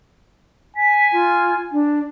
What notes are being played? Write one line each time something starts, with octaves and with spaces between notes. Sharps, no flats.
G#5 B6
F4
D4